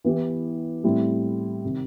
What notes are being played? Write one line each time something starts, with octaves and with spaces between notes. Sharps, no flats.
E3 B3 E4 G4
A2 G3 C4 E4
C3 D#3